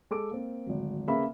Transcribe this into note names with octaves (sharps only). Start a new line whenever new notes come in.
G#3 A4 D6 D7
A#3 C4
D1 G#1
C#3 A#3 B3 E5 B5